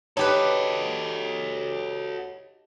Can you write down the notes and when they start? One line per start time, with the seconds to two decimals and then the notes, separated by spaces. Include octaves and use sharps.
0.17 D#4 F#4 G4 A4 B4 C#5